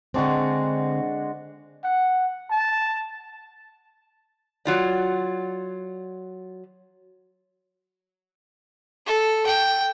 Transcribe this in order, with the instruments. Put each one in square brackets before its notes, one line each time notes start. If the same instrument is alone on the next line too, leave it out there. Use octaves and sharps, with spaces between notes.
[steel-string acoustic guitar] D3 C4 [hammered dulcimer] G#3 D4 F#4
[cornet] F#5
A5
[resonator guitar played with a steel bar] F#3 F4 D5
[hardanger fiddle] A4
G5